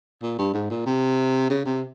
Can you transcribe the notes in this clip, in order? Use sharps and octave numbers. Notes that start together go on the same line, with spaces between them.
A#2
G2
G#2
A#2
C3
C#3
C3